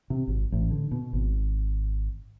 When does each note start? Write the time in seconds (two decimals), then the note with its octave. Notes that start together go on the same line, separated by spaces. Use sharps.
0.10 C3
0.27 G#1
0.52 A1
0.71 D3
0.91 B2
1.13 G#1